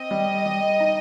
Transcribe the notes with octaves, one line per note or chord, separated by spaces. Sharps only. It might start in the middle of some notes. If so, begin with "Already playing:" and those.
Already playing: C4 D#5
G3
G3
D#4